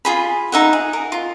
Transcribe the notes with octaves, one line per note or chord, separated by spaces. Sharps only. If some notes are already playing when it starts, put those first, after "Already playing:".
F4 G#4 B5
D#4 E5 F#5
G#4
A#4
F4